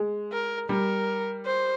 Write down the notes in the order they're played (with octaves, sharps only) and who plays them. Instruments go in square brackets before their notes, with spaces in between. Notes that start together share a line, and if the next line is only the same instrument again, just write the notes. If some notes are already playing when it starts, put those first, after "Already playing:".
Already playing: [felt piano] G#3
[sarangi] A#4
[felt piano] G3 [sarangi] A#4
[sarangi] C5